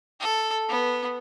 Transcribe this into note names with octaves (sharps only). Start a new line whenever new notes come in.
A4
B3